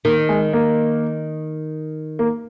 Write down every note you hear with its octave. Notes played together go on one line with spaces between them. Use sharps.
D#3 A#3
G#3
A#3
A#3